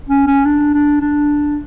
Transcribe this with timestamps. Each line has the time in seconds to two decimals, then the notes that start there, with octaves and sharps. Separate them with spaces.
0.09 C#4
0.27 C#4
0.45 D4
0.74 D4
1.01 D4